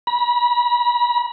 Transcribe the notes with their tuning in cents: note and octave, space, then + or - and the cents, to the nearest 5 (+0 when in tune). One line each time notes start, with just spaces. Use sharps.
B5 -35